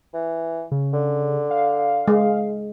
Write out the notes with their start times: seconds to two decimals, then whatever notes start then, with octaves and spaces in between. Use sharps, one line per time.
0.14 E3
0.71 C#3
0.93 D3
1.51 F5
2.08 G#3